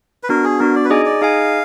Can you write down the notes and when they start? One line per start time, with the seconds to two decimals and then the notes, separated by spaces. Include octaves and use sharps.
0.23 B4
0.29 B3 D4 F#4 A#4
0.44 G#4
0.59 B3 D4 F#4 A#4
0.76 D5
0.85 B4
0.90 D#4 G#4 D5 D#5 G#5
1.06 D5
1.21 D#4 G#4 D#5 F5 G#5